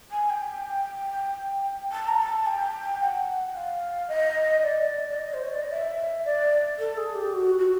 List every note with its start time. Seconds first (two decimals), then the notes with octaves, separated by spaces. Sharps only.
0.11 G#5
0.30 G5
1.92 A5
2.08 A#5
2.19 A5
2.46 G5
3.01 F#5
3.54 F5
4.08 D#5
4.63 D5
5.10 D5
5.16 D#5
5.33 C5
5.43 C#5
5.52 D5
5.62 D#5
5.70 E5
6.25 D5
6.79 A4
6.97 G#4
7.15 G4
7.34 F#4
7.59 F#4